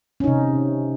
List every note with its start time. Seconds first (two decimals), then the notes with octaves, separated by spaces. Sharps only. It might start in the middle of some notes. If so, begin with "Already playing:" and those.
0.20 C#4
0.24 D#4
0.27 C3